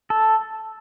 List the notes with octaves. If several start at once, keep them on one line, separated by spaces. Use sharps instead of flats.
A4